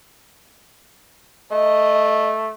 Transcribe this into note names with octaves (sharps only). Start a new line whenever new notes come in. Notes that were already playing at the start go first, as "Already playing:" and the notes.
A3 D#5